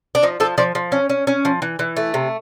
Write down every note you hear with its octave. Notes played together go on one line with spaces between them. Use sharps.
D4
F3 D#4
F3 A4
F3 D5
F3
C#4
C#4
C#4
F3
E3
E3
A3
C3